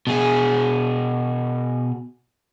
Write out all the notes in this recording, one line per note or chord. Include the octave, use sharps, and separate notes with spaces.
B2 G#4